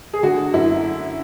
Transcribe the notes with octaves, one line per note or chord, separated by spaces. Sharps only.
G#4
D3 F#4
F#2 E4